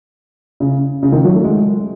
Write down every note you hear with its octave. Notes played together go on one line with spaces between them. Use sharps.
C#3
C#3
D#3
F#3
A3
G#3